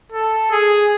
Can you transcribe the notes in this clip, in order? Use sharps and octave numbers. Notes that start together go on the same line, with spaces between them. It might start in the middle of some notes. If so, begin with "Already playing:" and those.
A4
G#4